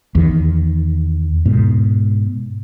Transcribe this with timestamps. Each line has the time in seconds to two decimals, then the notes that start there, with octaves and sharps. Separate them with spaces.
0.15 E2 D#3
1.46 G#2 B2